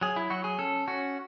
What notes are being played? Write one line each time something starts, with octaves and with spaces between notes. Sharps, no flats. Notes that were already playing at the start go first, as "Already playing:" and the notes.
F#3 G#4
E4
F#3 F#4
G#4
C#4 A4
C#4 F#4